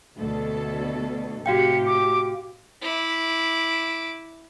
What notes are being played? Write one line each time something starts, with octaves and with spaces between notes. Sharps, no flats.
D2 B2 A4
A2 C3 F#4 G4 F5 G5 C#7
D6
E4 D6